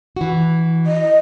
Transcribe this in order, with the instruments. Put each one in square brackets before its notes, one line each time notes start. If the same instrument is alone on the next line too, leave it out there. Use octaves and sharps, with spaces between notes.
[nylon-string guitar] E3 F#4
[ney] D#5